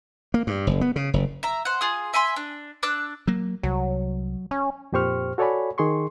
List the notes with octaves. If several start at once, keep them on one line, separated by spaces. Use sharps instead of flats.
A#3
G2
F#1
B3
C#3
F#1
E5 A#5
C5 F#5
F4 G#4 D#6
E5 G#5 B5 C6
D4
D4 D6 E6 F#6
F#3 A#3
C2 F#3
C#4
F2 A#2 G4 C5 C#6 F6
F#4 A4 C#5 D5 G#5 B5
D#3 G#4 C6 C#6